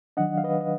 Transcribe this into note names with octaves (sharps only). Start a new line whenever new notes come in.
D#3 F#3 D4 D#5 F#5
F5
B4 D#5
D#5